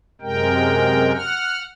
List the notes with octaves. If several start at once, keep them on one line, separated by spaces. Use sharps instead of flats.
F#2 C3 G#3 A#4 G5
F#5 F6